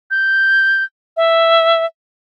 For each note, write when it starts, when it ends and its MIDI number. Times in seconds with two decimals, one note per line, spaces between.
0.11 0.84 91
1.17 1.86 76